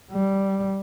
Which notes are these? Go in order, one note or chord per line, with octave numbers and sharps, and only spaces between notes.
G3